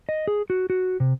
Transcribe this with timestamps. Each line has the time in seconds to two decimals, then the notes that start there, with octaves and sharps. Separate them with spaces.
0.09 D#5
0.27 G#4
0.50 F#4
0.70 F#4
1.00 C3